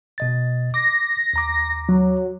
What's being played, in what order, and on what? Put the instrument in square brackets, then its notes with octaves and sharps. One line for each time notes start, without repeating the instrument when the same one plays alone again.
[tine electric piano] B2 D#5 A6
[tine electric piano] D6 [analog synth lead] A#6
[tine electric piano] D#2 A#5 D6
[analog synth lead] F#3